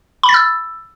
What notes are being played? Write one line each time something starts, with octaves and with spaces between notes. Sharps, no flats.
B5
A6
E6